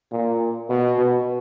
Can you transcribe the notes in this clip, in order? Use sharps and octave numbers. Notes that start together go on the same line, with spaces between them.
A#2
B2
B2